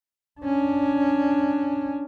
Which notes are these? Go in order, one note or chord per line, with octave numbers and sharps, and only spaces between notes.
C#4 D4